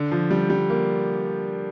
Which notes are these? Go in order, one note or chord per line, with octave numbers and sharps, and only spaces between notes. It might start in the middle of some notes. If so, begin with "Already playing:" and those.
Already playing: D3
F3
G3
G3
A#3